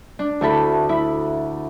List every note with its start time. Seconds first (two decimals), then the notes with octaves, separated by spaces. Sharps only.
0.19 D4
0.41 D2 E4 A4 B5
0.89 E4 B5